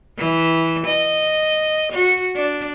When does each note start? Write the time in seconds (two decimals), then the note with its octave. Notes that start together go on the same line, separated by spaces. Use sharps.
0.18 E3
0.87 D#5
1.93 F#4
2.36 D4